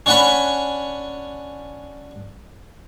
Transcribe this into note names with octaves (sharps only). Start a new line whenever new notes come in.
C#4 D4 C#5 F#5 G#5 B5